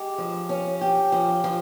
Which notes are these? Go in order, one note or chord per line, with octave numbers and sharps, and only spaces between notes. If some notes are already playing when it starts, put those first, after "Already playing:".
Already playing: G#3 G4
F3
C#4
G4
F3
F3